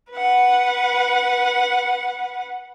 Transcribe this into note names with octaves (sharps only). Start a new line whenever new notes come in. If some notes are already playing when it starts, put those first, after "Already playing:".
B4 F#5